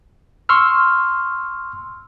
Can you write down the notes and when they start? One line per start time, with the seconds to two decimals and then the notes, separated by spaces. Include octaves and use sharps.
0.49 C6 C#6 E6 F6